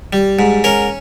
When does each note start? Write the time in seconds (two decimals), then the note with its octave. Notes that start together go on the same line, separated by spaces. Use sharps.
0.13 G3
0.39 G#2
0.64 C#4 A#4